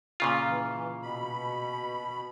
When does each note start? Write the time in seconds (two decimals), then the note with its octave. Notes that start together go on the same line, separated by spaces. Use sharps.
0.20 A#2 C#3 F4
0.49 E3
1.02 B2 B5